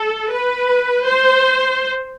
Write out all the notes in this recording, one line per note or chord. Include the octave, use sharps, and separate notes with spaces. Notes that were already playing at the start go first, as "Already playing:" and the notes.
Already playing: A4
B4
C5